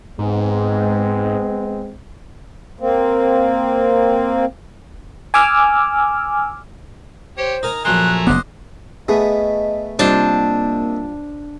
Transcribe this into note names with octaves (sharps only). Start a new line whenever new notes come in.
G#2 G#3 B3 C4
A#3 C4
G#5 D6 E6 F6
G4 C5 C#5
D#4 A#4 G#5 A#5
A#1 F#2 A3 G#5 A#5 C6 F#6
F#1 B3 G4 C5 D#5 F#6
A3 B3 G#4 D#5
C3 G3 A#3 D4 D#4 F4 C5